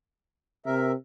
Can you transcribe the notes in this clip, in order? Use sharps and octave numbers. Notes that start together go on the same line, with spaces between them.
C3 A#4 E5